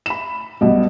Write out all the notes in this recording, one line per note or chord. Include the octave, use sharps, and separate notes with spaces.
B5 E7
B1 B2 G3